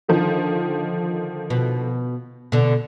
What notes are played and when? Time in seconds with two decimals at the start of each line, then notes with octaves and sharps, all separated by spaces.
0.08 D3 D#3 F3
1.50 B2
2.52 B2 D3